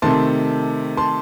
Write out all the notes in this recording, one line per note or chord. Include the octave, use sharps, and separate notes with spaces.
C3 D#3 A3 A5 C6
A5 C6